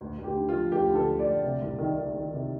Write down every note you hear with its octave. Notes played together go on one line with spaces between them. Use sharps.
D2
D2
G4
D3
F4
F3
D2 G4
D3
A4
D2
D5
D2
C3
C2
D#3
D#3
D#3
C3